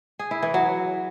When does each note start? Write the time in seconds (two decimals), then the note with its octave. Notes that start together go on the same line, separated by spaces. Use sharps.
0.19 G#4
0.31 E4
0.43 E3
0.54 F#3